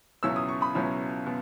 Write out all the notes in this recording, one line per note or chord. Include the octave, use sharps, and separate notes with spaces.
C#2 B2 F#3 C#4 E4 E6
D#6
C#6
B5 D#6
C#2 B2 F#3 C#4 E4
B2